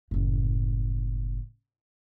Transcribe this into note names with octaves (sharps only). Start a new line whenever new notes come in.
F#1 A2